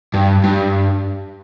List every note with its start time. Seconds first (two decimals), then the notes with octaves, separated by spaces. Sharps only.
0.14 G2
0.44 G2